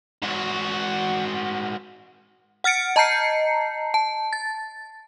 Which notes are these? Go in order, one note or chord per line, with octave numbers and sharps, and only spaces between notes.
G#2 F#4
F#5 F6 A6 C#7 D7
D#5 A5 A#5 G6 C7 C#7
A5
A6